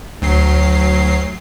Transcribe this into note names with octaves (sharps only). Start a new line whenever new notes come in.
D2 F#3 C7